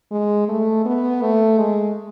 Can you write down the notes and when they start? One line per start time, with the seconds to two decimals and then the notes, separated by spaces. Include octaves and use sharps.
0.11 G#3
0.48 A3
0.85 B3
1.21 A3
1.58 G#3